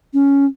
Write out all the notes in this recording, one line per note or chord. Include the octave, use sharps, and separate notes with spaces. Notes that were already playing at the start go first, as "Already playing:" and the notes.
C#4